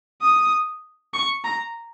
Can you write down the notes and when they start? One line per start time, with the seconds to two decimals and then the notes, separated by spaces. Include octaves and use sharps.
0.22 D#6
1.14 C#6
1.44 A#5